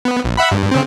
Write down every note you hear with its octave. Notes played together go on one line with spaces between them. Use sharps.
B3
A#1
E5 F#5 B5
G2
C#3 C4